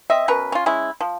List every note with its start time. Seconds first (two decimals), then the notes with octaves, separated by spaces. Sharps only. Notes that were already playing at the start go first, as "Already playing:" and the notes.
0.10 C4 D#5 E5
0.28 B2 C#4 A#4 B4
0.52 C#4 F4
0.66 G#3 C#4 E4
1.01 F3